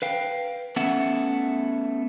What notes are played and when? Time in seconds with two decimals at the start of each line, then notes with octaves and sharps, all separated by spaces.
0.02 B4 F5 G5
0.76 A3 B3 C#4 E5 F#5